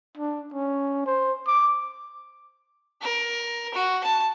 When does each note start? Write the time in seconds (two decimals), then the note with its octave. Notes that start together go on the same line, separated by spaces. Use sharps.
0.18 D4
0.54 C#4
1.06 C5
1.47 D6
3.02 A#4
3.74 F#4
4.04 A5